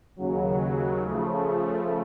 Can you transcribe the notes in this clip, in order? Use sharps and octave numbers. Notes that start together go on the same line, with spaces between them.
D#2 C#3 F#3
C#3 F3 A3